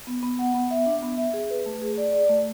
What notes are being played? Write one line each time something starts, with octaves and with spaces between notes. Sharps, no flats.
B3
B3
F#5
B3
E5
D4
B3
E5
G#4
B4
A3
G#4
D5
D5
A3